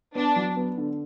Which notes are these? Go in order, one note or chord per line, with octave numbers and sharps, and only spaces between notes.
B3 D4
F#3
B3
D3